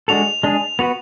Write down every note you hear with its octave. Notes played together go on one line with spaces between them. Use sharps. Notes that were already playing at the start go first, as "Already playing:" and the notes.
G#3 D4 F#4 A4 F7
G#3 D4 G#4
B3 F#4 B4 F7